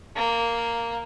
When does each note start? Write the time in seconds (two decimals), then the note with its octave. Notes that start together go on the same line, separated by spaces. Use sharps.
0.16 A#3